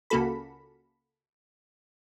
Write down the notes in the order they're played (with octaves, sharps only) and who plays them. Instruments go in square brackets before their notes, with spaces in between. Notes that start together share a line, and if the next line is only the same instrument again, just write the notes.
[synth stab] C#2 C#3 A#3 F#4 A4 B5